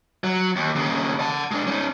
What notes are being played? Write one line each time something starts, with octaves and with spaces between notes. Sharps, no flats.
F#3
D#2
D#2 C#3
F#5 A5
G#3 D4
C#4 D#4